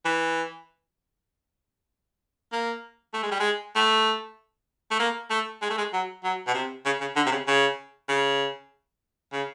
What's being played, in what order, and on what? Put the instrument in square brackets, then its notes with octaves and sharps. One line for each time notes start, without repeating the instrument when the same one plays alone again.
[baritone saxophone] E3
A#3
A3
G#3
G3
G#3
A3
A3
A#3
A3
G#3
A3
G#3
F#3
F#3
B2
C3
C#3
C#3
D3
C3
C#3
C#3
C#3
C#3